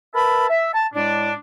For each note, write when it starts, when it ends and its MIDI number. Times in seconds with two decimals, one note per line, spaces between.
0.15 0.47 70
0.15 0.47 71
0.15 0.47 76
0.15 0.47 81
0.15 0.47 83
0.50 0.70 76
0.74 0.86 81
0.94 1.33 45
0.94 1.33 56
0.94 1.33 62